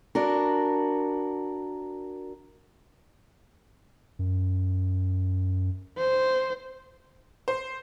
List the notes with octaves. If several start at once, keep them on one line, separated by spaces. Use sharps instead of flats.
D4 F#4 A#4
F#2
C5
C5